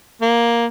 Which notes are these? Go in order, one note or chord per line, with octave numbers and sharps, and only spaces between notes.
A#3